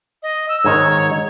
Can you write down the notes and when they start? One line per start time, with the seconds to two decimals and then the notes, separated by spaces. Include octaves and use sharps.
0.23 D#5
0.49 E6
0.64 G#2 D#3 D#4 C#5